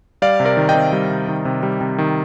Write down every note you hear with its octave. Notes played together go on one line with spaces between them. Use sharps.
G3 D5 F5
C3
A#4 D5
D#3
D#5 G5
C3
G3
C3
D#3
C3
G3
C3
D#3